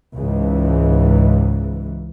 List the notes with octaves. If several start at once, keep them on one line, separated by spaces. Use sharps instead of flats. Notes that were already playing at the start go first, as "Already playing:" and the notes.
C#2 G#2 E3